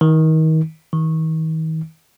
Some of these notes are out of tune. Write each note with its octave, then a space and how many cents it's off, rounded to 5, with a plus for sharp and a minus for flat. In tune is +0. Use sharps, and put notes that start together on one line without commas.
D#3 +30
D#3 +40